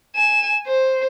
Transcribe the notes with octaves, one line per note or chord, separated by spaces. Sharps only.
G#5 E7
C5